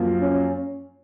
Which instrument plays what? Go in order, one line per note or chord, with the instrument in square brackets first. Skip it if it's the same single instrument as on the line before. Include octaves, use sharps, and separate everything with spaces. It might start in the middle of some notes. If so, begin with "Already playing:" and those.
Already playing: [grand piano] F#2 F3 A#3 F4
[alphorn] C#4